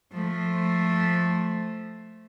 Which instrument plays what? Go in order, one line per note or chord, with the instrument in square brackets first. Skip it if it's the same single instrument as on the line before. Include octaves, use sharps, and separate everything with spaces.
[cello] F3 A3